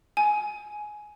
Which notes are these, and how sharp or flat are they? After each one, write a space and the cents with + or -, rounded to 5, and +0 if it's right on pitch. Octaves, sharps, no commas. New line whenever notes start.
G#5 +15